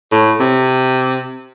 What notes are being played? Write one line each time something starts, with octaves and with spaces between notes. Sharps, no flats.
A2
C3